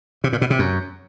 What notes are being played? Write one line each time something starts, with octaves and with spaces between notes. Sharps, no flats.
C3
A#2
B2
C3
F#2